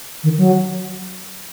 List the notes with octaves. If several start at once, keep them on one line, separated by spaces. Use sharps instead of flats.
D#3
F#3